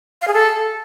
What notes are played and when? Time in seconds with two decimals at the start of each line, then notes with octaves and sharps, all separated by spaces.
0.22 F5
0.28 G#4
0.33 A4